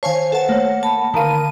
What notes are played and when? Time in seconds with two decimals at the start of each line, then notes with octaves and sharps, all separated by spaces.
0.03 D#3 C5 C#5 F5 G#5 A5
0.32 A4 B4 F#5 A5
0.49 A3 A#3 C#5
0.83 A5 B5
1.14 D3 D#3 A#4 F5 A#5 D#7